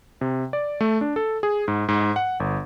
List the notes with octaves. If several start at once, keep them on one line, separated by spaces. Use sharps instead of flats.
C3
D5
A3
D4
A4
G#4
G#2
G#2
F#5
G1